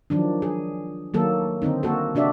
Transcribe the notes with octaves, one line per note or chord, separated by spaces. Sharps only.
D#3 F3 F#3 D4
G#4
D#3 F#3 A#3 A4
D3 D#3 C4 D#4
A#3 F#4 A4
C3 D4 F#4 D5 E5